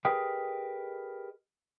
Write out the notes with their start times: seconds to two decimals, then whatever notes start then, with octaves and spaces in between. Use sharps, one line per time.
0.05 G4 G#4 A#4 B4 D#5 G5